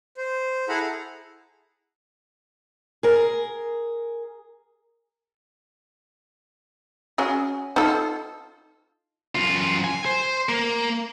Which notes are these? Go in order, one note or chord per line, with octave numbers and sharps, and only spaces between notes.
C5
E4 G#4 A4 F#5 A#5 B5
G#4 A#4
C#4 F#4 G#4
D#4 F4 A4
F#2 F4
G#5
C5
A#3